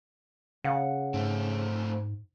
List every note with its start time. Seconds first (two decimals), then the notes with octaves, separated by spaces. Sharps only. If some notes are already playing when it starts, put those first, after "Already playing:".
0.64 C#3 F5 F#5
1.14 G#2 A3 C4